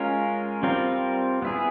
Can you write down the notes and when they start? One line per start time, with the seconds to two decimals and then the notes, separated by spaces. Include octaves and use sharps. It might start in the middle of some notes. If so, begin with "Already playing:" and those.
Already playing: G#3 C#4 F4 A#4
0.63 G3 C4 F4 A#4
1.42 B3 E4 G#4